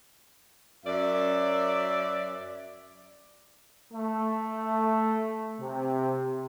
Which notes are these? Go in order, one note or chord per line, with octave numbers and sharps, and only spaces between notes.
F#2 D5 E5
A3
C3